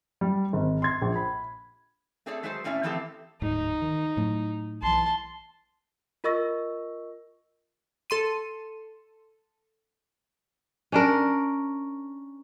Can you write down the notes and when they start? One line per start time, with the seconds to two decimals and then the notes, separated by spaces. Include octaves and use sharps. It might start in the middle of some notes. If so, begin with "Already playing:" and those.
0.21 G3
0.53 G#1
0.82 C6 G#6
1.02 A#1
1.16 B5
2.26 A3 C4 G#4 A4 C#5 D5
2.43 F#3 G#3 G#4 A4 B4 C5
2.64 A2 C4 C#4 D5 E5
2.83 E3 F3 A3 C4 G4 A4
3.42 D1 D2 G#2 D#4
3.82 D#3
4.17 A2 F#3 A3
4.82 B1 E3 A5 C6
6.24 F4 A#4 D#5 C#6 E6 A#6
8.10 A4 C6 D#7
10.92 C#4 D4 A#4